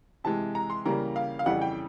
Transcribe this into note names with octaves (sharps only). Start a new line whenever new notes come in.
C3 E3 G#3 A5
A#5
C6
C#3 E3 G3 A#3 A#5
F5
F5
F2 C#3 E3 G3 F#5
G5